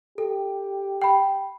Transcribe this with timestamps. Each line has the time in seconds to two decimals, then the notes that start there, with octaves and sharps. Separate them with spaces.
0.18 G4 A4
1.02 G5 B5